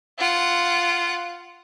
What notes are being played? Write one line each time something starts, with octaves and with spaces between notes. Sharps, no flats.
F4 F#5